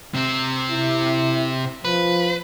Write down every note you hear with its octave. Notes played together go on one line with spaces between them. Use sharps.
C3 C4
E4
F3 B4